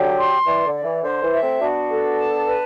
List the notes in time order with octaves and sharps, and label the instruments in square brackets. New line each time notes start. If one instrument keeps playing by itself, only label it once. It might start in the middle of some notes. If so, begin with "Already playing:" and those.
Already playing: [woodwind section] D3 F#3 [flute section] G4
[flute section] C6
[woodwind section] E3 [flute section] D5
[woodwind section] D3
[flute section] D5
[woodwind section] E3
[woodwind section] D3 [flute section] C5
[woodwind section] E3
[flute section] E5
[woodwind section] A3 C4
[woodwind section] B3 D4 [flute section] F#4
[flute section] A4
A5
B4